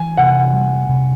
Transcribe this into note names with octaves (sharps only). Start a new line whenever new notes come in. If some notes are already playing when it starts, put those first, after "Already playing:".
Already playing: E3 G#5
C3 F#5
G3
C3